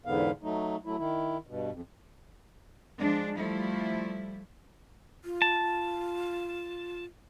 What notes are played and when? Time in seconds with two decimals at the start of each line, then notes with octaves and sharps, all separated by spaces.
0.06 E2 G#2 D3 B3 F5
0.43 F#3 A3 D#4
0.85 F#3 A3 E4
0.98 D#3 E4
1.47 G2 B2
1.71 F2
2.99 F3 G#3 D4
3.37 F3 G3 A3 E4
5.23 F4
5.42 A5